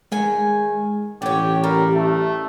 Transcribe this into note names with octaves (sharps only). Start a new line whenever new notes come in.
D#3 G#3 G#5
A1 D3 G4 C#5
G3 A#4
A3